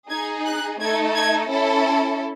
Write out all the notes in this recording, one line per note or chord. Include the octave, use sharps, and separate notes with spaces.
D#4 G#4 G#6
F#6
A3 D#4 A4 G#6
G#6
C#4 E4 A4